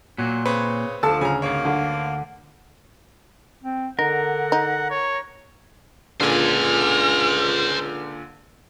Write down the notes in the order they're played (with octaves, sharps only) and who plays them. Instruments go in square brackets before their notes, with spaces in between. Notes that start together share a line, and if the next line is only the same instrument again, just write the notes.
[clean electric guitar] A#2 [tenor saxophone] F#3
[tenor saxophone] C#3 [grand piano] C4 B4 C#5
[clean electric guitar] D2 [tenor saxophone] F3 [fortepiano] A4 A5 [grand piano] E6
[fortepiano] C#3 [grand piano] G#5 A#5
[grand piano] G#1 C#5 [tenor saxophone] A#3
[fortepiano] D3
[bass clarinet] C4
[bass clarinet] D3 [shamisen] D#4 [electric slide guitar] A#4 [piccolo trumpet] F#5
[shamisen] D#4
[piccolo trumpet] C#5
[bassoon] C#2 [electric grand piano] A#2 D3 [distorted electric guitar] C5 G#5 [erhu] F6